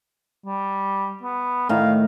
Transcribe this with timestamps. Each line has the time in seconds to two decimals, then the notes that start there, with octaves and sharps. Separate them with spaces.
0.46 G3
1.23 B3
1.69 A2 D#3 F5